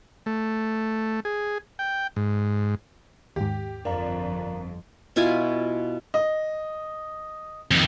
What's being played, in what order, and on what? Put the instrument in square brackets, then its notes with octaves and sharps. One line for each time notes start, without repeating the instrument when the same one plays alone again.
[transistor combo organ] A3
G#4
G5
G#2
[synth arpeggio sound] D#2 G#2 [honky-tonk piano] G4
[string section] G1 F2 [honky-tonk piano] D4 [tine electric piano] A#4 F5 A#5
[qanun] B2 E4 F4 G#5
[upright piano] D#5
[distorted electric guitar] F2 D#3